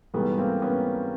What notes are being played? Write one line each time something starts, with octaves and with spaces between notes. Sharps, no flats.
G#2 E3 G3 A3 B3
A#3 C4
B3 C#4